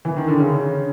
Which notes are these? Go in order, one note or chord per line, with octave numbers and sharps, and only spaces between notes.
E3
D#3
D3
C#3